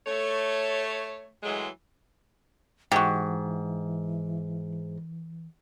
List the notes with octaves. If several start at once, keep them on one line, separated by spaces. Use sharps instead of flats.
A3 C#5
A2 E3 F#3 G#3
G#2 E3 F#4 G4